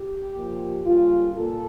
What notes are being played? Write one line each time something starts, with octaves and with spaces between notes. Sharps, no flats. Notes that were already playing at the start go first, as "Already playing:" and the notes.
Already playing: G4
A#2 F3 A#3
C#3 G3 A#3 F4
A#2 A4